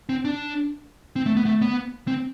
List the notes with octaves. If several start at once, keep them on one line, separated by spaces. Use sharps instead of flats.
C4
D4
C4
A3
B3
A3
B3
C4